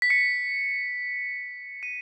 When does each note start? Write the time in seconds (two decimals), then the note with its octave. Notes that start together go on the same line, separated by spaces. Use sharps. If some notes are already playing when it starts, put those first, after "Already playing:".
0.02 B6
0.10 C#7
1.83 D#7